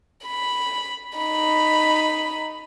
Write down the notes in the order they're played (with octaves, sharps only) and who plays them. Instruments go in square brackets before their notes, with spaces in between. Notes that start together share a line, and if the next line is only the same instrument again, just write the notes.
[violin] B5
D#4 B5